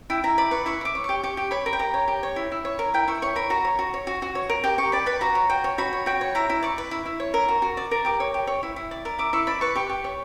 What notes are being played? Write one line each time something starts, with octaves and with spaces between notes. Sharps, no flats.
E4 G5
E4 A#5
D5 B5
B4 C#6
E4 C#6
E4 D6
C#5
G4 C#6
G4 C#6
G4
C#5 B5
A#4
G5
G4 A#5
C#5
G4
C#5
E4
E4
C#5
A#4
E4 G5
E4 C#6
C#5 C#6
A#4 B5
F#4 A#5
C#5
F#4
C#5
F#4
F#4
C#5
A#4
G4 G5
G4 C#6
D5 B5
B4 B5
F#4 A#5
C#5
F#4 G5
C#5
F#4 B5
C#5
F#4 G5
C#5
E4 A#5
E4
D5 C#6
B4
E4
E4
C#5
A#4
F#4
F#4
D5
A#4
G4 D6
C#5
G4
C#5
E4
E4
D5
A#4
E4 D6
E4 C#6
D5 B5
B4 C#6
G4 C#6
G4
C#5